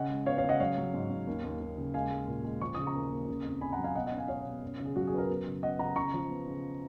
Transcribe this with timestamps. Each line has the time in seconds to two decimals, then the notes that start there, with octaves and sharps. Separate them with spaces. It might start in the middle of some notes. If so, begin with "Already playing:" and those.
Already playing: C#3 C#4 D#5 F#5
0.09 G#3
0.26 B3 C#5 F5
0.38 C#5 F5
0.44 C#3
0.49 D#5 F#5
0.60 F#3 C#5 F5
0.77 F#3
0.94 G#2
1.11 G#2
1.27 D#2
1.44 D#2
1.61 D#2
1.78 C#3
1.94 G#3 F5 G#5
2.11 G#3
2.28 A#2
2.44 G#3
2.61 F3 C#6
2.75 C#3 D#6
2.87 A#5 C#6
2.95 D#2
3.12 A#3
3.28 C#3
3.45 F2
3.61 C#3 G#5 B5
3.73 F#5 A#5
3.78 F#3
3.84 F5 G#5
3.95 B2 D#5 F#5
4.06 D#5 F#5
4.12 C#4
4.18 F5 G#5
4.28 B2 C#5 F5
4.46 B2
4.62 F#2
4.80 C#3
4.86 G#4
4.96 F#3 F#4
5.07 G#4
5.13 F#2 B4
5.18 F#4 A#4
5.29 B3
5.46 C#3
5.63 B3 D#5 F#5
5.79 C#3 F#5 A#5
5.96 C#3 A#5 C#6
6.14 F3
6.30 B3
6.47 C#3